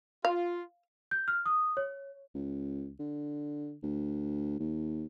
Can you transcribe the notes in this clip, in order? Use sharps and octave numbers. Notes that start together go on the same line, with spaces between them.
F4 F5
G6
F6
D#6
C#5
C#2
D3
D2
D#2